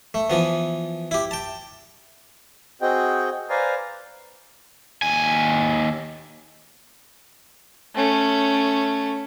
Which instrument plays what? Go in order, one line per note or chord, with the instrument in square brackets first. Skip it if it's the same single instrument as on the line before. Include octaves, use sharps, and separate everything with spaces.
[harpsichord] A3
E3 F3 B3
E4 G4
G5 A5
[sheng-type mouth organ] C4 F#4 G#4 D#5 G5
B4 C5 D5 F5 G#5 A#5
[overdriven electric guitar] D#2 G#5
[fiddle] A3 C#4